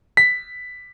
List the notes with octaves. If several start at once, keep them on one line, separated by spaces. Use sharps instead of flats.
B6